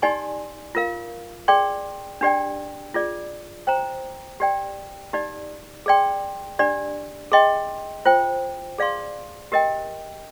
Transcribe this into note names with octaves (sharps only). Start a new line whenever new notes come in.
D#4 G4 D5 G#5 C6
F4 A#4 F5
G#4 D5 G5 C6
D4 G4 D5 G5
F4 G#4 D5
C5 G5 A#5
G4 D5 G5
D#4 G4 D5
G#4 D5 G5 C6
D4 G4 D5
G#4 D#5 G5 C6
F4 C5 G5
G#4 D5 F5 C6
G4 A#4 D#5 G5